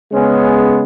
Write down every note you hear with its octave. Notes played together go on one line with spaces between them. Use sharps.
C#3 G#3 B3 C#4